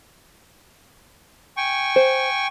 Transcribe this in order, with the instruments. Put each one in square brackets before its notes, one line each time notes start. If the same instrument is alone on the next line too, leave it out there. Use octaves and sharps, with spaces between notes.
[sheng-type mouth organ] G5 G#5 C#6
[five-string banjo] C5